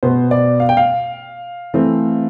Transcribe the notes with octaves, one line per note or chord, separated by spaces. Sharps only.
B2 B3 C5
D5
F5
G5
F5
E3 A3 C4